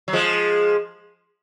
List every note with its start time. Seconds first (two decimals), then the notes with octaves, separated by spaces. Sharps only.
0.08 F#3
0.13 F3 G#3